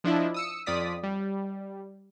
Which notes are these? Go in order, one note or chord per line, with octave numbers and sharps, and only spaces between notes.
F3 D4 E4 D#5
D#6 E6 C#7
F2 F4 D5 D#6 B6
G3